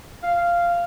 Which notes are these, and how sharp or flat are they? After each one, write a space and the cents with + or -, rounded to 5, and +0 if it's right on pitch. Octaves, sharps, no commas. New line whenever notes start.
F5 -10